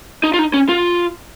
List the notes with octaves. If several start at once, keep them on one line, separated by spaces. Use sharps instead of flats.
D#4
F4
D#4
C#4
F4